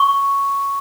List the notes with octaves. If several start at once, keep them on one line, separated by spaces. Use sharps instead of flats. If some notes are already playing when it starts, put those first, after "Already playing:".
Already playing: C#6